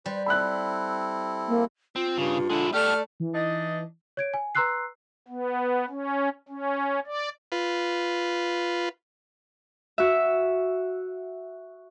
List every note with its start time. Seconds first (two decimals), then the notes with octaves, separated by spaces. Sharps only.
0.06 G3 B4 C5
0.26 C4 E4 A4 B5 E6 F#6
1.48 A#3
1.96 C4 F4
2.17 G2 C#3
2.50 D3 G#3 E4
2.74 A3 G4 A4 D5 F6
3.20 E3
3.33 D4 D#4 D#5
4.17 C#5 G#6 D7
4.34 G#5
4.55 B4 A#5 C6 E6 F#6 C7
5.28 B3
5.89 C#4
6.48 C#4
7.07 D5
7.52 F4 B4
9.98 F#4 E5